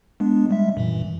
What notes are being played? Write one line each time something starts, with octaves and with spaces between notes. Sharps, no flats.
G#3 B3 D4
G3 G#3 E5
F#2 A#2 E3